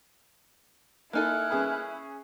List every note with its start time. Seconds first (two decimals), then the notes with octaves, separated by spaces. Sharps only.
1.13 A#3 D#4 E4 A4 G#5 F6 F#6
1.50 C#4 G#4 B4